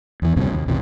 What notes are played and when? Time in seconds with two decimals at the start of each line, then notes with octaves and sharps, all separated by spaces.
0.22 E2 E3
0.36 D2 G2 C3
0.52 D#2
0.66 A#1 E2 C3